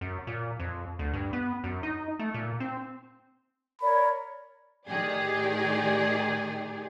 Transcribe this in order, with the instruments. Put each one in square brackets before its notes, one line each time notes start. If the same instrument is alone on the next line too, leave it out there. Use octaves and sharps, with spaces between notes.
[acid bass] F#2
A#2
F2
D2
G2
B3
F#2
D#4
A3
A#2
C4
[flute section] A#4 C#5 D5 [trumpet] B5
[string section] A2 D#3 G4 G#4 D5